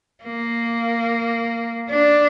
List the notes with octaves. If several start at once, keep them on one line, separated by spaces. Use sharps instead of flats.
A#3
D4